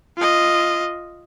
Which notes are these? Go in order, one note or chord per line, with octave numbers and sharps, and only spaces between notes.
F4 D#5